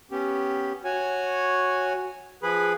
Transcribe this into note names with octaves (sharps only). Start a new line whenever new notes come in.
B3 C#4 G4
F#4 C#5 G#5
F3 G#4 B4 B5